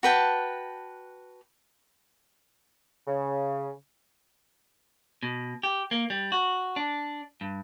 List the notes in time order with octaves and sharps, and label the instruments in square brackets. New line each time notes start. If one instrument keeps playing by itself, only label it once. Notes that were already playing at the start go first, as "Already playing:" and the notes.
[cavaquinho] F#4 B4 G5 A5
[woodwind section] C#3
[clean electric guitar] B2
G4
A#3
G3
F#4
D4
G2